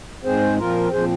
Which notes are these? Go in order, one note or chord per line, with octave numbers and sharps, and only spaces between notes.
G#2 G#3 C4 G#4 C5
A#2 F3 C4 F4 A#4
A#2 F3 C4 G#4 C5